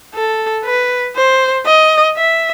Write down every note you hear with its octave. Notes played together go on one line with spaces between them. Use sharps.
A4
B4
C5
D#5
E5